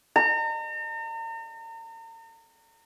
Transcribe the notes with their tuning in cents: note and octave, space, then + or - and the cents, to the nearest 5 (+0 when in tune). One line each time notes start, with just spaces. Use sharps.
A#5 -40